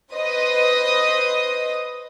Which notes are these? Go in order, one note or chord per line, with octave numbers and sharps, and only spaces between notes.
B4 C5 D#5 D#6